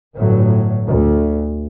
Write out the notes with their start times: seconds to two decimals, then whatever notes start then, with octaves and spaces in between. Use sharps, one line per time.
0.16 G1 A2 F#3
0.86 D2